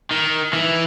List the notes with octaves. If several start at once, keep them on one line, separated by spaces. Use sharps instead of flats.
D#3
E3